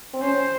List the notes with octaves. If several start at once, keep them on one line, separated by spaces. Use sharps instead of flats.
C4
C#4 C5